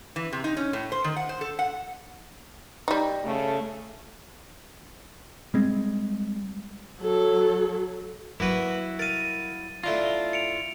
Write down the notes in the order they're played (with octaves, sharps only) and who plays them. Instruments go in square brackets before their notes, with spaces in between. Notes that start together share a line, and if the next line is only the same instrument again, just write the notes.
[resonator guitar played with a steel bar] E3
C3
D#4
C#4
A2
C5
D#3
F#5
C5
A4
F#5
[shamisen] G3 D#4
[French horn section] C#3 A3
[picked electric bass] G3 G#3 C4
[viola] F#3 A4
[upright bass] F#3 G3 [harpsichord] A#3 B4 [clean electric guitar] E4 F#4
[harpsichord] A#4 F5 [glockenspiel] A6 D#7
[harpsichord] A3 D4 A#5 [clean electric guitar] E4 F4
[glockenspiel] G7
C#7 D7 F7